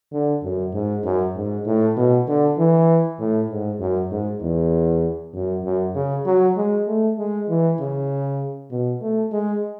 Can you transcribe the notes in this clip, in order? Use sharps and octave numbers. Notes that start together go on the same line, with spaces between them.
D3
F#2
G#2
F#2
G#2
A2
B2
D3
E3
A2
G#2
F#2
G#2
E2
F#2
F#2
C#3
F#3
G#3
A3
G#3
E3
C#3
B2
A3
G#3